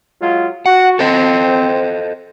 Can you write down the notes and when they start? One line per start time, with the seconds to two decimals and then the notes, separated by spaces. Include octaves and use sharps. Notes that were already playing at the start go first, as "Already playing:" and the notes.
0.21 F#3 G#3 F4
0.66 F#4 F#5
0.99 C4 A4 C5 D#5